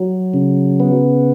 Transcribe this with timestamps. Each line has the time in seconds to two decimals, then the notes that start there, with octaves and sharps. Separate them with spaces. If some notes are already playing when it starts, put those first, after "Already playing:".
Already playing: F#3
0.34 C#3
0.80 B3